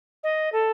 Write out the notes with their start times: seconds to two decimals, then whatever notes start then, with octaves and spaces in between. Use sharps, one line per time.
0.23 D#5
0.52 A4